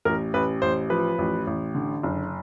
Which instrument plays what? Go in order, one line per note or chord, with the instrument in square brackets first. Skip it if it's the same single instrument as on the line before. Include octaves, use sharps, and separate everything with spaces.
[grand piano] A1 A#4
A1 B4
A1 C5
F3 B4
A1
A1
D3
F#1